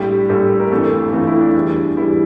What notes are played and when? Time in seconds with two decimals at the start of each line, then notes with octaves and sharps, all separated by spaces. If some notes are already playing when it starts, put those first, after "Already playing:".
Already playing: A#1 A2 G3 G4
0.29 A#1 A2 G3 A4
0.60 A#4
0.71 G1 F2 E3 A3 A4
1.13 G1 F2 E3 A3 F4
1.27 E4
1.40 D4
1.54 E2 E3 G3 D4
1.96 E2 E3 G3 E4